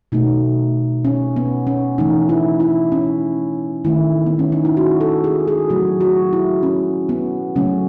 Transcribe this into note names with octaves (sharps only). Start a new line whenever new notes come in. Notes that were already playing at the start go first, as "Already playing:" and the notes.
B2 A3 D#4
C#4
B3
C#4
C#3 E3 A3 D#4
E4
E4
C#4
D#3 A3 E4
B3
C#4
D#4
E4
F#4
A4
G#4
G#4
C#3 F#3 A3 F#4
F#4
E4
C#4
B3
C#3 F#3 A3 C#4